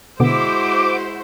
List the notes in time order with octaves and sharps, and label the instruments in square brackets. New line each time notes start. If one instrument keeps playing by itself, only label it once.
[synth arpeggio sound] B2 D3 B3 [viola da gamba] G#3 E4 [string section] F#4 C5 [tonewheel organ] D6